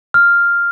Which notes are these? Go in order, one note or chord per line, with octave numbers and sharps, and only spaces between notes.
F6